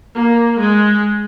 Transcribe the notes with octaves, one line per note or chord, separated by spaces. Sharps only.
A#3
G#3